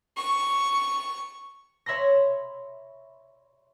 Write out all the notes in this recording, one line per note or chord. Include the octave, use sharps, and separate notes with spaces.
C#6
C#5 E5 B5 C6 A#6